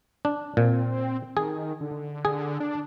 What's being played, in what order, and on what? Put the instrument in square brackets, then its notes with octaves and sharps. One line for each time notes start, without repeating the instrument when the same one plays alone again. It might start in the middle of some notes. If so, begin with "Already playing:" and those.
[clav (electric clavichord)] D4
[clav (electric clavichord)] A#2 [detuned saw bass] C4
[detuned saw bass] D#3 [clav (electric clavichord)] G#4
[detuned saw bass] D3
[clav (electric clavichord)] G#4
[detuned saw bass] D4